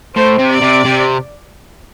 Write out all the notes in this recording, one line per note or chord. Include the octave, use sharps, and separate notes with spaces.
A2 C5
C3
D5
C3
C3